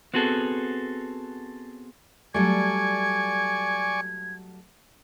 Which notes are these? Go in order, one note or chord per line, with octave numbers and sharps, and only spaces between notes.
B3 C4 F#4 G#4 A4
F#3 G3 A3 D5 G#5 C#6 G#6